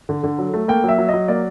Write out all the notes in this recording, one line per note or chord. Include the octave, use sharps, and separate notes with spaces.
D3
D3
F#3
A3
A#3 G5
F#3 E5
F#3
D#5
F#3
A#3 D5